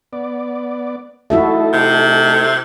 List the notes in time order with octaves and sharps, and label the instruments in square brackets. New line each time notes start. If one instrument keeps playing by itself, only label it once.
[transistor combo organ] B3 D5
[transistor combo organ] A3 D#4 A4 [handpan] E4 F#4 E5
[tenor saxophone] C3